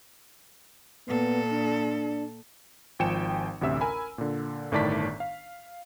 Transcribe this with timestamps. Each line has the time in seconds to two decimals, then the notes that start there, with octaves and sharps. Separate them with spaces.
1.08 A#2 B3 A4
1.52 D4
2.99 G#1 F3 G5 G#5 C#7 E7
3.61 A1 D2 C3 E5 E6
3.81 A#4 G#5 B5
4.18 A#2 D3
4.72 G1 A2 D#3 D5 A5 B6
5.20 F5